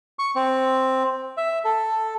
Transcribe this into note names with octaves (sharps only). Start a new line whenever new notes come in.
C#6
C4
E5
A4